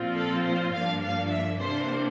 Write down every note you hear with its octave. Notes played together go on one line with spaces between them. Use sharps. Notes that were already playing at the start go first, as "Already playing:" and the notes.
Already playing: A#2 F3 C4 F4
A4
C5
G2 F3 A#3 D4 F5
F5
E5
C3 E3 A#3 D4 C5